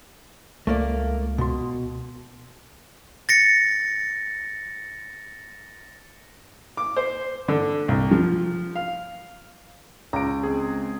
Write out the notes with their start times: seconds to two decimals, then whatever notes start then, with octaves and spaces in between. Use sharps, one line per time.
0.67 C#2 A3 A#3 D5
1.38 B2 C6
3.29 A6 A#6 C#7
6.77 D6
6.97 C5
7.48 D3
7.88 C2
8.11 F3
8.75 F5
10.13 C#2 A#5 D7
10.43 G#3 C4 G#4